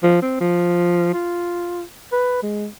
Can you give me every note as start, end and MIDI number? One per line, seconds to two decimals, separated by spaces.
0.03 0.20 53
0.22 0.40 60
0.40 1.11 53
1.13 1.83 65
2.12 2.40 71
2.43 2.67 56